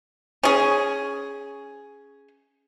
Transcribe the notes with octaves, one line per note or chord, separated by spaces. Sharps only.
C#4 G#4